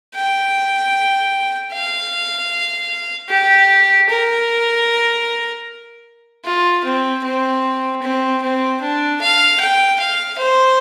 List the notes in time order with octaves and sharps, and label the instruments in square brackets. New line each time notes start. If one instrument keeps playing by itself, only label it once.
[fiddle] G5
F5
G4
A#4
F4
C4
C4
C4
C4
D4
F5
G5
F5
C5